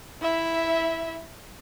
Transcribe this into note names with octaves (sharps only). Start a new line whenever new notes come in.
E4 E5